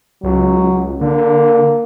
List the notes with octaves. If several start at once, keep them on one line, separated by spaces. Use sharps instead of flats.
C#2 F#3
D3 A#3